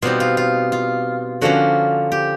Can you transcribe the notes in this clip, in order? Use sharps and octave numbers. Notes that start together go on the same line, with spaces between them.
B2 G3 C4 D#4 F4
F4
F4
F4
D3 F3 A#3 C#4 F4 F#4
G4